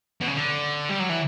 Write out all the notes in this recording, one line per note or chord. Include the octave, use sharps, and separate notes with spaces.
B2
C#3
D3
G3
F#3
E3